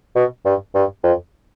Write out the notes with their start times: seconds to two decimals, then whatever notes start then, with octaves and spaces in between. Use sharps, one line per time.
0.15 B2
0.45 G2
0.75 G2
1.03 F2